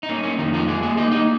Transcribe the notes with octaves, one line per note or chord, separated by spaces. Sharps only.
D#4
A#3 C#4
C#4
F2 D#3 D#4
F3 F4
G#3 A#3 G#4
G#3 G#4
A#3 D#4 D#5
D#4 D#5